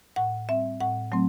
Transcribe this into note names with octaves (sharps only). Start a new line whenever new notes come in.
A2 F#5
G3 C4 E5
A2 F#5
F#3 A3 C4